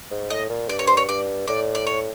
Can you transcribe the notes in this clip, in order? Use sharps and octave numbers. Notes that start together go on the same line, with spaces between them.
G#2
A2 D#5
A#2
G2 D5
C#5
C5
C#5
G2 D5
A2 D5
D5
C#5